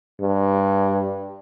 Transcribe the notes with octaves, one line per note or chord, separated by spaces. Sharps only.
G2